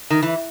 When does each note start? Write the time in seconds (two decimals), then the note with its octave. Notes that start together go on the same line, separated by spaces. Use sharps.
0.10 D#3
0.22 E3